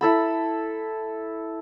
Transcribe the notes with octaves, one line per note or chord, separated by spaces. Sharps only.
E4 A4 B5